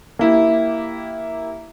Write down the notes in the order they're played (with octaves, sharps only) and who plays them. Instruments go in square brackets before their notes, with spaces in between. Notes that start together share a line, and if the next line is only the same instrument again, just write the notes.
[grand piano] A#3 E4 G4